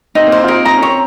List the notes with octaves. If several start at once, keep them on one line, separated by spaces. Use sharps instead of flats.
C4 D#4
A#3
C5
C4
F4
D#4 A#4
D#4 A#5
C#4
C4 C#5